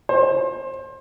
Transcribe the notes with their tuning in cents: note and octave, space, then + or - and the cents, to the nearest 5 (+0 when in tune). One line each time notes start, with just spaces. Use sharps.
C5 +30